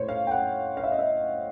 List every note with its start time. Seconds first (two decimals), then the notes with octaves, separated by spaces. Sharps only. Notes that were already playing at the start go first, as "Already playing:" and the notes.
Already playing: A2 C5 C#5
0.09 F5
0.27 G5
0.31 F#5
0.77 F5
0.84 E5
0.92 D#5
0.99 E5